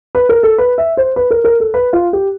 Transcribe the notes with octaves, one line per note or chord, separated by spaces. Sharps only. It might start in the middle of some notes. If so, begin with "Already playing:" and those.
B4
A#4
A4
B4
E5
C5
B4
A#4
A#4
A4
B4
F4
G4